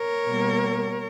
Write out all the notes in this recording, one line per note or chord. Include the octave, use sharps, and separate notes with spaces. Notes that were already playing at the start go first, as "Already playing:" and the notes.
Already playing: A#4 C#5
B2 G3 A#3